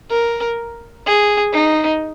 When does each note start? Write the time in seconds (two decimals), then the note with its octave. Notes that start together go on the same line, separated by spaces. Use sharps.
0.10 A#4
1.06 G#4
1.54 D#4